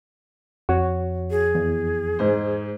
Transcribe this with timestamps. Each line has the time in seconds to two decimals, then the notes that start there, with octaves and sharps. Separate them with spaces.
0.69 F2 F#4 C#5
1.30 G#4
1.55 E2
2.19 G#2 C5